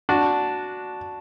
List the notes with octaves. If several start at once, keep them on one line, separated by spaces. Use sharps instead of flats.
D4 F#4